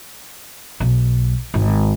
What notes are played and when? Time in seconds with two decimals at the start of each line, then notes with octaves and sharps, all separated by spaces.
0.80 B1
1.54 G#1